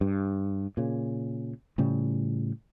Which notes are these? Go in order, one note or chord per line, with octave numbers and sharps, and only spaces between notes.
G2
A#2 C#3
A2 C#3 F3 G3